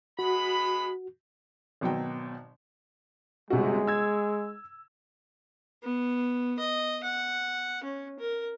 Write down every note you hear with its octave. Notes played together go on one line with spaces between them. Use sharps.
G#3 B3 F#4 B5
G#1 B2 F#3 G5
G1 C3 G#3 F#4
E6 G#6
B3
D#5
F#5
C#4
A#4